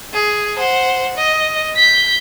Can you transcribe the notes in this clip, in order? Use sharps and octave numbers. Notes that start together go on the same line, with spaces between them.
G#4
C5 F#5
D#5
G6 B6